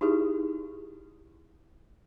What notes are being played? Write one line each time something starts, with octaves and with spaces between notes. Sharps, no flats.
D#4 E4 G4 G#4